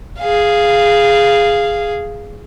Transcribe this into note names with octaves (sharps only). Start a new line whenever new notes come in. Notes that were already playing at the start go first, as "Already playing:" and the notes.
G#4 F5